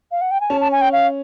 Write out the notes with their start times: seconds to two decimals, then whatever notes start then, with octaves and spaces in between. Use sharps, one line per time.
0.12 F5
0.21 F#5
0.31 G5
0.41 G#5
0.50 C#4 A5
0.61 A5
0.72 G#5
0.81 G5
0.93 F5